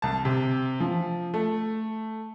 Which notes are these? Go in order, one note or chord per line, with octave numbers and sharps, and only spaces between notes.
C2 A5
C3
F3
A3